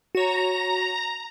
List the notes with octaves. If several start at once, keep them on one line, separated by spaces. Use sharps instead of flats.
F#4 C#5 A#5